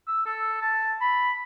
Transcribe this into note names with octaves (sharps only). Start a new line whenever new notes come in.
E6
A4
A5
B5